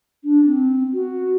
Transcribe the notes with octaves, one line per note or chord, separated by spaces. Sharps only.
D4
C4
F#4